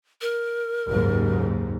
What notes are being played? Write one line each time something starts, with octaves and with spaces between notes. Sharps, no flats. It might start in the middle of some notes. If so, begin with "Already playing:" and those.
A#4
F#1 D#2 G#2